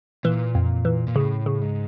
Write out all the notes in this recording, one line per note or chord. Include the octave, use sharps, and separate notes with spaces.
A#2 E3
F2
E3
A#2
A2 C#3
C#3
G#2